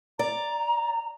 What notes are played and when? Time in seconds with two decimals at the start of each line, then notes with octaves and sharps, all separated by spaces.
0.19 D5 A#5